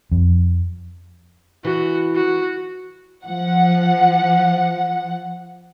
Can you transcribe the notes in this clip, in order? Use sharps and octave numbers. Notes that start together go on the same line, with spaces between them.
F2
E3 F#4
F#4
F3 F#5